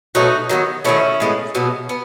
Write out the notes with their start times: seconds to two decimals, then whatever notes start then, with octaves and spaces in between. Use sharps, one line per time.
0.15 B2 F#3 A3 D#4 F#4
0.49 D#3 F#3 B3
0.85 D#3 F#3 A3 C#4 E4
1.20 A2 G#3 B3
1.55 B2 F#3 B3
1.89 B3